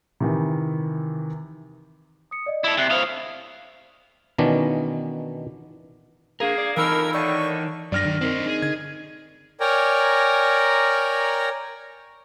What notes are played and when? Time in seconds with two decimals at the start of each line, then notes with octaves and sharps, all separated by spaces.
0.20 C3 D#3 E3
2.31 D#6 C#7
2.46 D5 D#5
2.64 E4 A4 E6
2.77 C3 E5 F#6 C7
2.90 A2 C5 F5 D#6
4.38 B2 D#3 E3 B3 C#4 D4
6.40 A#3 D4 G#4 A#4 F5
6.58 D5
6.77 F2 E3 D#4 A#4 B5 E6
7.14 A2 D3 D#3 D5 C#6
7.92 G2 F#3 D4 D5 F6 A#6
8.05 D#3
8.21 C4 D4 D#4 A#4 C5
8.46 G#4
8.62 D3 G#6
9.60 A#4 C#5 D5 G5 G#5 A#5